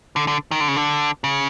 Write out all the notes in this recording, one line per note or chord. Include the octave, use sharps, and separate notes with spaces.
D3
D3
D#3
D3
C#3
D3
C#3